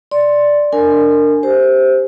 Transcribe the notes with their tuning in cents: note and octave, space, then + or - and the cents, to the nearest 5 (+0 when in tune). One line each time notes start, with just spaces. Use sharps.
D5 +0 C6 +10
D4 +0 A#4 -25 G#5 +10
G4 +0 C5 +0